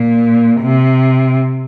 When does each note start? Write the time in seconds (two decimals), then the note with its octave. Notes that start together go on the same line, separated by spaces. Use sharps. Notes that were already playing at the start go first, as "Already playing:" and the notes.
Already playing: A#2
0.61 C3